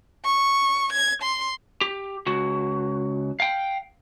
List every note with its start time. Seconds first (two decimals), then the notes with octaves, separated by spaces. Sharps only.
0.25 C#6
0.93 G#6
1.23 C6
1.81 G4
2.27 C#2 F#4
3.40 F5 G5